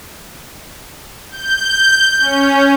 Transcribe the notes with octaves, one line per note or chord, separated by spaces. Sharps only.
G6
C#4